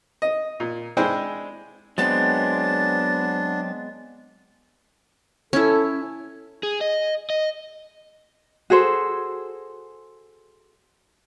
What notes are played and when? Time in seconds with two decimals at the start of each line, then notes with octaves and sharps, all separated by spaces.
0.22 D#5
0.60 A#2
0.97 G#3 D4 E4 C5 G5 G#5
1.98 F#3 G#3 B3 C4 D4 A6
5.53 C#4 E4 A4
6.63 G#4
6.81 D#5
7.30 D#5
8.70 F#4 G#4 A4 C5